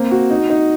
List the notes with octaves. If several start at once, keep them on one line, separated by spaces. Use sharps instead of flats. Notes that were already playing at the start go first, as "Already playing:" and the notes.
Already playing: A#3 C4
F#4
D#4
D#4